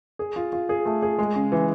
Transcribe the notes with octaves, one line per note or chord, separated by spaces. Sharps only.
G#4
F4
F4
G#4
A3
G#4
G#3
C#3
E3